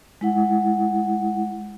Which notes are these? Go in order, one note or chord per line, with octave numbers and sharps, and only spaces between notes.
G#3 E4 F#5